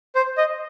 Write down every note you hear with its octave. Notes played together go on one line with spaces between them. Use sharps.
C5
D#5